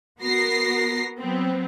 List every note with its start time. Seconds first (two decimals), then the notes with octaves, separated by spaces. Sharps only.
0.21 B3 F#4 A#4 A#6 C7
1.19 F#3 B3 C4